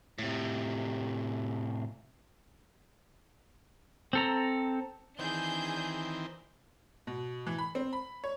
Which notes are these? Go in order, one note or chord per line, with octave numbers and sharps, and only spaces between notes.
A2 C3
C4 A4 A#5
D#3 E3 C4 D4 G#4 G6
B2
E3
B5
C4
B5
C#5